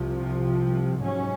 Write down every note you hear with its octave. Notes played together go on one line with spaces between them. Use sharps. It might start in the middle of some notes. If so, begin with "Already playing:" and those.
Already playing: C2 C3 F3
G#2 F#3 C#4